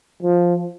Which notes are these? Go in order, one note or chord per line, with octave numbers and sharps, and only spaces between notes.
F3